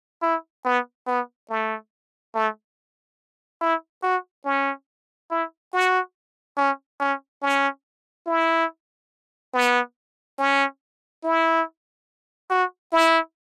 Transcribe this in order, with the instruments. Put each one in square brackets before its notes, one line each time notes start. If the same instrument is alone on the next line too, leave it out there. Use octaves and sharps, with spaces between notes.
[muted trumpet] E4
B3
B3
A3
A3
E4
F#4
C#4
E4
F#4
C#4
C#4
C#4
E4
B3
C#4
E4
F#4
E4